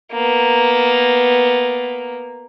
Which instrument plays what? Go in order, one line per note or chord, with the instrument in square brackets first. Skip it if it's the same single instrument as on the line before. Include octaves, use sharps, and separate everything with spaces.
[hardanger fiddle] A#3 B3